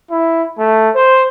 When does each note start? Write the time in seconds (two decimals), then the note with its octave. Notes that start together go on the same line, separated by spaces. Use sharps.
0.11 E4
0.58 A3
0.95 C5